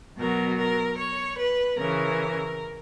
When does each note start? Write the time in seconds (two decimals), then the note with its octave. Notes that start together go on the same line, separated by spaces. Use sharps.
0.18 B2 F#3 A#4
0.58 A#4
0.98 C#5
1.38 B4
1.78 C#3 E3 A#4